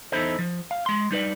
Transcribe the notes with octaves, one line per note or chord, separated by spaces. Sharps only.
E2 D#4 E4 A4 C5
F3
F5
G#3 C6
G3 D#4 B4 D5